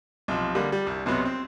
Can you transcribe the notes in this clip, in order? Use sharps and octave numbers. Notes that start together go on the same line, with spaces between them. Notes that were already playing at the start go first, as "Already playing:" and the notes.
B1 C3 F3
D3 G3 A#3
G3
C2
B1 C3 F#3 B3
C4